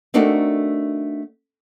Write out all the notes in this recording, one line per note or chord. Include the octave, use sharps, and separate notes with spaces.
A3 C4 D4 D#4 F#4 A#4